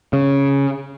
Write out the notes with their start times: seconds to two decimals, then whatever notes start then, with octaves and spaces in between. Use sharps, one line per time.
0.13 C#3